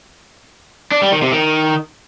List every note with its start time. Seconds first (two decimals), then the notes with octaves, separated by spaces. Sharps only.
0.91 D4
1.02 G3
1.12 D#3
1.22 C3
1.32 D#3